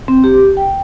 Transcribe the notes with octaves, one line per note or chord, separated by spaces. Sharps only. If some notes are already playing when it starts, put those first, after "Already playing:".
C4
G4
G5